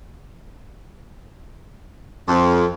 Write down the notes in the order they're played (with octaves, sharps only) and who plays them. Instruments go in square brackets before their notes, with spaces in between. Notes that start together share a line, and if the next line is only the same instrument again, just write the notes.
[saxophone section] F2